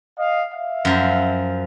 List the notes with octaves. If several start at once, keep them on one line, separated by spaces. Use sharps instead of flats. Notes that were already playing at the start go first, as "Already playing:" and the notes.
D#5 F5
E5 F5
F#2 F3 C5